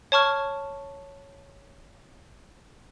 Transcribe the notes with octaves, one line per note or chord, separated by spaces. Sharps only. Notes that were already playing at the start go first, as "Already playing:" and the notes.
C#5 A5 C#6 F6